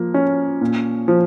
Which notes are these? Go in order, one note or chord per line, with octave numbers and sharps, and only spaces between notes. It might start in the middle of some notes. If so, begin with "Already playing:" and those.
Already playing: F3 A#3
C#4
A#2
F3